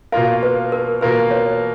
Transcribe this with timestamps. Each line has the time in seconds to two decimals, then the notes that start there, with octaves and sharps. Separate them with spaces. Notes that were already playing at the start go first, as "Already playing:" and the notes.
0.12 B2 A#3 F4 A#4 F5
0.43 B4
0.72 A#4
1.01 B2 A#3 F4 A#4 B4
1.31 C#5